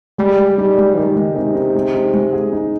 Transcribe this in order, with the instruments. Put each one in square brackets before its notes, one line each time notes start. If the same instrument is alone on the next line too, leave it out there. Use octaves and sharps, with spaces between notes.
[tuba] G3 [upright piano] G#3
[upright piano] G#3
[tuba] G3 [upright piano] D#4
[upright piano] G#3
[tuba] D#3 [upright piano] G4
[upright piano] G#3
[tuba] C3 [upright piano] D#4
[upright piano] D#4
G#3
D#4
G#3
G#4
D#4